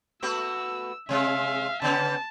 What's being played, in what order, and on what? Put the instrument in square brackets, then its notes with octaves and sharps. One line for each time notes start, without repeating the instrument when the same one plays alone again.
[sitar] A3 B3 F#4 [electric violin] E6
[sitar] C3 G#3 [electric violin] E5 F5
[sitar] C#3 B3 C#4 [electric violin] A5